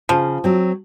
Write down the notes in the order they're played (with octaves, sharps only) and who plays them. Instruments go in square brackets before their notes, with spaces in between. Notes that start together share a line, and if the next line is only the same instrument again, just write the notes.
[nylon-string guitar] C#3 [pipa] F3
[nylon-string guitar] F#3 C4